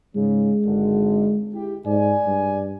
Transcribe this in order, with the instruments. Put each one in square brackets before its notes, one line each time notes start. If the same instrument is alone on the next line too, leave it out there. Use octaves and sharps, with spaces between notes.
[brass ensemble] G#2 C#3 [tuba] G#3
[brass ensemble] G#1 D3
E4 G4
[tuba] G#2 [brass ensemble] D5 G#5
[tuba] G2